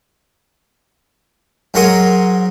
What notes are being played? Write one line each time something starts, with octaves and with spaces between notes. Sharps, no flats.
G#2 F#3 A#4 F#5 C6 D#6